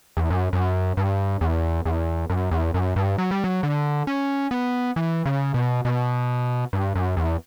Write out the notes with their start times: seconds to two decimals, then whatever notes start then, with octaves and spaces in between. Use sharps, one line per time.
0.17 E2
0.30 F#2
0.53 F#2
0.97 G2
1.41 E2
1.85 E2
2.30 F#2
2.51 E2
2.74 F#2
2.96 G2
3.18 F#3
3.31 G3
3.44 F#3
3.63 D3
4.07 C#4
4.51 B3
4.96 E3
5.26 C#3
5.54 B2
5.85 B2
6.73 G2
6.95 F#2
7.17 E2